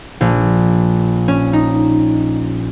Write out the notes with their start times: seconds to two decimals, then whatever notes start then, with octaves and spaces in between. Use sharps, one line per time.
0.21 A#1
1.28 C#4
1.53 D#4